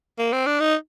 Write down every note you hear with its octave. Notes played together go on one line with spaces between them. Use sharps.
A#3
C4
D4
D#4